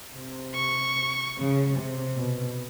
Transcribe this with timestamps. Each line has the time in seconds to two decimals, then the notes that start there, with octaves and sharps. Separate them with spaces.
0.15 C3
0.55 C#6
1.37 C#3
1.77 C3
2.18 B2